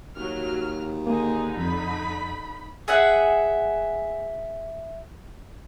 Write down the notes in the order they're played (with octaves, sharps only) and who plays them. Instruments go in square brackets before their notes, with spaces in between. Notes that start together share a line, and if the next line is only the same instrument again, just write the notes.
[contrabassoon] D#2 [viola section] F#3 [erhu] F6
[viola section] D3 D#4 [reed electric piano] A#3 [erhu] G#4
[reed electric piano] F2 [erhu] B5
[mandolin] G#4 E5 F#5